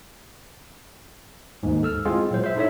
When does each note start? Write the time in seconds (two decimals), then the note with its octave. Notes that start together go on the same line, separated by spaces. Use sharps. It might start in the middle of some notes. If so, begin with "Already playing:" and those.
1.63 D#2 G#2
1.83 A4 E6 F6
2.05 G#3 C4 E4 F4 G#4
2.31 A#2 F#3 C5
2.44 C5 E5
2.56 D#4 E4 A4 C#5 E5